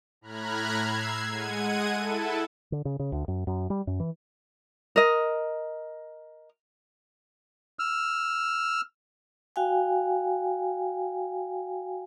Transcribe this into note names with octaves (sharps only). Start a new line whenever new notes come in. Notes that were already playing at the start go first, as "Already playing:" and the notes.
A2 A#5 B5 F6 F#6 G#6
E6 G#6 C7
G#3 F#5 G#6 D#7
E4 A4 A5
D3
C#3
C#3
D2
F#2
F#2
G3
F#2
E3
A#4 D#5
E6 F6
F#4 F5 G5 G#5